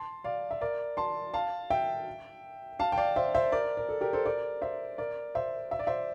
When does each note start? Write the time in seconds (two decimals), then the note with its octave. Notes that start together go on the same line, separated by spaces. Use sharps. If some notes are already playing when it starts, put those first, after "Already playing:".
Already playing: A5 C6
0.24 D5 F5
0.51 E5
0.61 A#4 D5
0.97 A5 C6
1.34 F5 A5
1.70 E5 G5
2.79 F5 A5
2.92 G5
2.98 D5 F5
3.16 C5 E5
3.34 C5 E5
3.52 A#4 D5
3.77 A#4
3.89 A4
4.01 G4 A#4
4.13 A4 C5
4.25 A#4 D5
4.61 C5 E5
4.98 A#4 D5
5.35 C5 E5
5.71 E5
5.79 D5
5.87 C5 E5